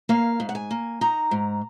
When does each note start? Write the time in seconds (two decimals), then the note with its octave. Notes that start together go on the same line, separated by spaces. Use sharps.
0.09 A#3 F5
0.40 G#2
0.49 F#5
0.55 G#5
0.71 A#3
1.01 D#4 A#5
1.31 G#2